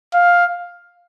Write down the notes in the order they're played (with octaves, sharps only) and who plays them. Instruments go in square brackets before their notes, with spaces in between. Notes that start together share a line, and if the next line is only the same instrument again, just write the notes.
[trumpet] F5